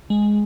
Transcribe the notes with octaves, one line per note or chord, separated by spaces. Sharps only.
G#3